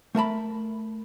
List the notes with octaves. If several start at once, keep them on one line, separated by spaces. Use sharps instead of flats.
A3 A#4 A5 B5